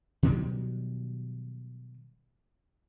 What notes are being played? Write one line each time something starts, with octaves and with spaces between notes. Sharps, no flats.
B2 D#3 F#3 G3